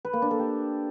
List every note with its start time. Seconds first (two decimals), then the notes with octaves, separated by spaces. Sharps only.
0.05 B4
0.13 A#3
0.22 D4
0.31 A4
0.39 G4